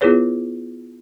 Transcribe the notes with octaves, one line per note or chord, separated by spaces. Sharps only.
B3 E4 F4 G#4 B4 C#5